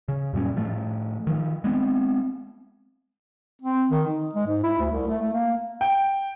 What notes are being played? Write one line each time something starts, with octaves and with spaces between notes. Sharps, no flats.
C#3
F#2 A#2 G3 C#4
A2 F3 A3
D#3 F3
G#3 B3 C4
C4
D#3
D#4
G#3
G#2
E4
D2
C2
A3
A3
A#3
G5